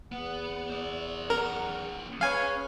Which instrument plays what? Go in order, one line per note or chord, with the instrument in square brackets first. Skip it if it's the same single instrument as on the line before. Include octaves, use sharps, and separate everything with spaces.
[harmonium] E2 F#5 [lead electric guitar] B3
[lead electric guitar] C5 D5
[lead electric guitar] B3 C#4 [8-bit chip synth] A#4
[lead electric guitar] C#4 [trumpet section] G#4 B4 C#5 [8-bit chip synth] F5 G#5